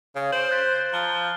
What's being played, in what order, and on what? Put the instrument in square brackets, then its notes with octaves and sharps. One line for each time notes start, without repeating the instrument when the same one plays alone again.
[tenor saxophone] C#3
[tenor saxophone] C5 [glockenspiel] D7 F#7
[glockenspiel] F#6 A6 B6
[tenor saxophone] F3 [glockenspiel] A#5 G7
[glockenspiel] F6